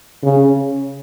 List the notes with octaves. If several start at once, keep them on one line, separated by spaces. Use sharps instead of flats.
C#3